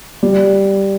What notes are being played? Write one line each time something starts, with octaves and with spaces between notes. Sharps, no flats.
G3